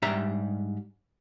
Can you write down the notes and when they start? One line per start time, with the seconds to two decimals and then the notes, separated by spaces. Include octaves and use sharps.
0.02 G#2 G3 D4 G4 E5 A#5